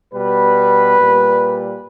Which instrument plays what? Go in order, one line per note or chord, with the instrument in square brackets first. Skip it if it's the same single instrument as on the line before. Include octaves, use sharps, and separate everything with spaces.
[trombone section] B2 G3 B4
A#2 G3